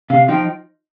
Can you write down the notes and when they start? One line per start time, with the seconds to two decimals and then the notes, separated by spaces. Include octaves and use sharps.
0.10 C3 F5
0.28 F3 D#4 G5